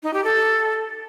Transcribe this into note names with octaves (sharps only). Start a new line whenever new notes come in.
D#4
G4
A4